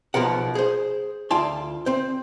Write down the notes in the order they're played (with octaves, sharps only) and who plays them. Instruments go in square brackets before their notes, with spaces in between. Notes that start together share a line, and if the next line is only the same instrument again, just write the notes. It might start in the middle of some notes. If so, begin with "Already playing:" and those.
[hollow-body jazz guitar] B1 B2 F3 A#4 F#5
G#4 C5
D2 F4 G5 A5 C6
C4 C5